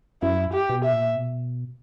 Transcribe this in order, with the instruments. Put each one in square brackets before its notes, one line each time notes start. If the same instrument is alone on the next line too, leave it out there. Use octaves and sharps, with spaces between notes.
[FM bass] F#2 [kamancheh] E4
[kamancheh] G4
[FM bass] B2
[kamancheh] E5
[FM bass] A#2
B2